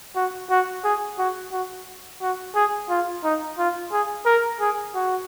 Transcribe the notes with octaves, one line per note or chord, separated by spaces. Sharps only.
F#4
F#4
G#4
F#4
F#4
F#4
G#4
F4
D#4
F4
G#4
A#4
G#4
F#4